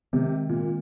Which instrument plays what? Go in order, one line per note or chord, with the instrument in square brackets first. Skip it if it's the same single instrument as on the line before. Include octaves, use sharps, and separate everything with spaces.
[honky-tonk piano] C3 [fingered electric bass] D#3 G#3 C4
[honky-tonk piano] A#2